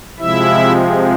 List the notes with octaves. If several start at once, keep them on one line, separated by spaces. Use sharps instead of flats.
C3 F3 G#3 E4 E5